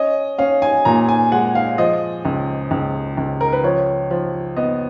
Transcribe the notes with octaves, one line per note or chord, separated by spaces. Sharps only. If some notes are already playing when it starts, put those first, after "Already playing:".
Already playing: C#4 D#5
C#4 F5
G#5
A#2 A#5
G#5
G#3 F#5
F5
F3 D#5
C#2
C#2
C#2
A#4
B4
F3 C#5
F3
B3 D#5